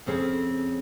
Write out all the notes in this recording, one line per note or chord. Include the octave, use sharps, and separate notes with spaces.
F2 C#3 C4 G#4 C5